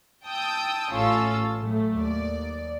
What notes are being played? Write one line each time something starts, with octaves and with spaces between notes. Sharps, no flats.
G5 A5 D#6 E6 G6
A1 A2 C#4 F4 A4 E6
A2 F#3 A3
D#2 D5